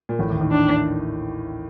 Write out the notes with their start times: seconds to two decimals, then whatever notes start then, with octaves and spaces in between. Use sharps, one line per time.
0.09 A#2
0.19 A1 A2
0.30 D#2 D#3
0.40 D#2 D#3
0.52 D4